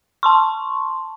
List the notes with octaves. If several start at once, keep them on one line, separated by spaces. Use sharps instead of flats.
A5 C6 C#6